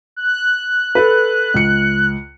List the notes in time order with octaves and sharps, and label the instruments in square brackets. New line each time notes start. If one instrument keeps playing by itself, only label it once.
[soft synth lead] F#6
[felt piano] A4 B4
C#2 C#7